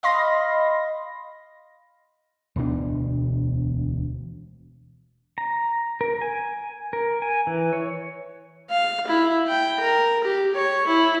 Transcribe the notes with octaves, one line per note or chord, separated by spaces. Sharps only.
D#5 F5 B5 C6 A#6
E1 D2 B2 D4
A#5
A#4
G#5
A#4
G#5
E3
C#5
F5
E4
G5
A#4
G4
C#5
E4